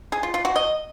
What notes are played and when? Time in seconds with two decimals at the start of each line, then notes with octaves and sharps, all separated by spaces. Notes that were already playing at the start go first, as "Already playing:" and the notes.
0.12 G#4
0.23 F4
0.34 F4
0.45 F#4
0.56 D#5